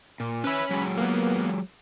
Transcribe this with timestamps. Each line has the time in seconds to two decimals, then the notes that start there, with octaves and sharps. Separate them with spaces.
0.20 A#2
0.44 C#4 B4 E5 B5
0.70 F#3 G#3
0.98 A#3 B3